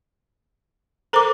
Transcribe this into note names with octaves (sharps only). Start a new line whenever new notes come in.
A4 A#4 C5 A#5 D6